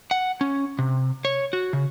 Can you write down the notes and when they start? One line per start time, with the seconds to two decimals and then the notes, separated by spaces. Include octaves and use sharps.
0.11 F#5
0.41 C#4
0.79 C3
1.25 C#5
1.53 F#4
1.73 C#3